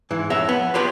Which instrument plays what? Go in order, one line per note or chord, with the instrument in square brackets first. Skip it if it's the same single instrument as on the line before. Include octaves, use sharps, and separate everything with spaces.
[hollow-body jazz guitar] G#2 E3
F2 C#5 E5
B3
F4 G4 B4 C#5 C6